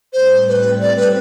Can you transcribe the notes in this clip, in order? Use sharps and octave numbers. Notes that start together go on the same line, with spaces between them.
A2 G3 C4 C5
B4
D5
B4